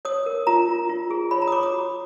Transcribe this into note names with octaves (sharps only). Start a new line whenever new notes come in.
C#5 D#6
A#4
F4 A#5
F4
F4
G#4
C#5 B5
A#5
D#6
C#5 D6
D#6
F#4